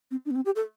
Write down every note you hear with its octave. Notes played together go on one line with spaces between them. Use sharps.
C4
D4
B3
C4
G4
A4